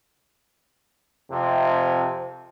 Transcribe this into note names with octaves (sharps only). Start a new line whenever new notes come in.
F2 C3